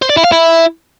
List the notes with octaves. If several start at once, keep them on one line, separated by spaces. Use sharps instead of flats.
C5
D5
E4
F5
E4